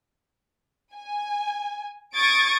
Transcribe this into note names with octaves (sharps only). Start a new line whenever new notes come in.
G#5
C#6 D#6 G#6 A6 D7